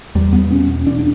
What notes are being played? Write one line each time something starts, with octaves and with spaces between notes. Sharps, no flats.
E2 G3
B3
B2 C#4
E2 D4
D4